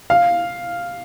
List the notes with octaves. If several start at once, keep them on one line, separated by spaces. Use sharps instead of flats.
F5